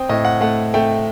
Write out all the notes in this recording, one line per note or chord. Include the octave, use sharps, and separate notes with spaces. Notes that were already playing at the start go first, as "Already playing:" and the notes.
Already playing: C4 G5 D#6
A2 D#5
F#5
A3 F#5
A3 G5